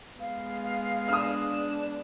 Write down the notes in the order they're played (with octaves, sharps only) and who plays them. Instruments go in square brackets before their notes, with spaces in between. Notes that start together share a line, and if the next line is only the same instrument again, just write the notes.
[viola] G#3 B3 [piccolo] F5
[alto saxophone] D4 [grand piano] D#6 F6